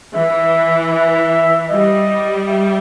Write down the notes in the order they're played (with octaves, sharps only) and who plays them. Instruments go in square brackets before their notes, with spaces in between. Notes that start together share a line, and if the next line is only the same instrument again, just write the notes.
[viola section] E3 [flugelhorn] E5
[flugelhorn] E5
[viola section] G3 [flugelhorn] D#5
[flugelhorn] E5